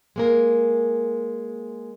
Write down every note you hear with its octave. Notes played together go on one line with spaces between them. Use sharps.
G#3 A#3 A#4